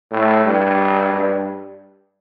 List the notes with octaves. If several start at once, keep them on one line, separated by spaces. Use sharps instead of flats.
A2
G2
G2